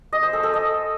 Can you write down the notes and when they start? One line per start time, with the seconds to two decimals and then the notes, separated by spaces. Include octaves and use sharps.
0.13 D#5
0.23 C5
0.33 A4
0.43 A4
0.54 D#5